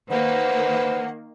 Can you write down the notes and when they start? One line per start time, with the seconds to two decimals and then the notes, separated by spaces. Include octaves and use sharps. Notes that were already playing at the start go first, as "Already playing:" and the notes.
0.10 D#3 A#3 B4 C5 F#5